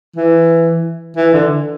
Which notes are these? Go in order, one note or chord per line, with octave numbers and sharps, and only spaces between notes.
E3
E3
D3